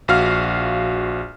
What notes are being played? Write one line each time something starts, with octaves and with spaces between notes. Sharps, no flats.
A#1 F#4 F5 F6